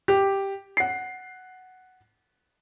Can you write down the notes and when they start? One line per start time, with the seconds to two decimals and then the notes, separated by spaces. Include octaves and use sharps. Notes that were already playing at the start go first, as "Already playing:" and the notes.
0.08 G4
0.77 F#5 C7